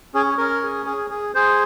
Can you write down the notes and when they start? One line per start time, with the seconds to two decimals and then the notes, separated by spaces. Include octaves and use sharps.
0.14 C#4 G#4
0.38 C#4 A#4
0.63 G#4
0.86 G#4
1.10 G#4
1.35 G#4 C5